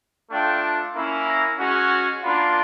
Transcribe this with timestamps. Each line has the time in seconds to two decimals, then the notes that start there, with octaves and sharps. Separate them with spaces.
0.30 A3 D4 F4 G5
0.94 A#3 C#4 E4
1.26 A#5
1.58 G#3 C#4 F#4
2.23 A#3 D4 F4 B5